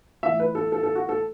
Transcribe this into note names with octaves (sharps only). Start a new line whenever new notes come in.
E3 E5
A2
B4
A4
A4
A4
F#4
A4